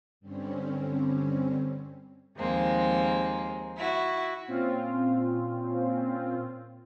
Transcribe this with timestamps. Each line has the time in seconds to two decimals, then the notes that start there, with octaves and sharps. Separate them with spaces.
0.20 G2 D3 G3 C4 C#4
2.37 D#2 F3 G#3 A#3 C4
3.75 E4 F#4
4.48 A#2 C4 C#4 F4